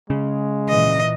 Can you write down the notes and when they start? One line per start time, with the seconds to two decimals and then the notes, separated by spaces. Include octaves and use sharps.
0.10 C#3 G#3
0.69 A#2 E3 D#5